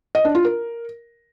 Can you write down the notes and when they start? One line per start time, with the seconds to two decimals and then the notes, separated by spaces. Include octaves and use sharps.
0.15 D#5
0.25 D4
0.35 F4
0.45 A#4